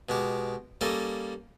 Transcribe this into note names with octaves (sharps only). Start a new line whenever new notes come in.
B2 G#3 G4
G3 A#3 C#4 A4 D#5